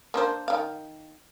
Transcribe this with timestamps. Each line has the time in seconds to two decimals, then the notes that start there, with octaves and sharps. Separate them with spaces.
0.14 A#3 D4 C5
0.48 D#3 F5